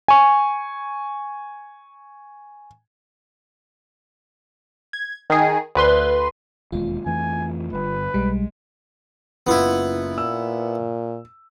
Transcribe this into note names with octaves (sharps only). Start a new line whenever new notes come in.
G#5 C#6
G#6
D#3 G#4
D2 B4 C6
E1 D#2 G#3 F4
F2 E3 A3 G#5
G1 G2 B4
B1 G3 G#3
F#1 B3 E4 F4
A#2 E6